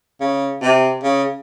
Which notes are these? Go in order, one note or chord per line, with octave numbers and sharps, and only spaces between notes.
C#3
C3
C#3